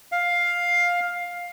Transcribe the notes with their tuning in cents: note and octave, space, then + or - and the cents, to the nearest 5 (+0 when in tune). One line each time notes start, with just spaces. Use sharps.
F5 +10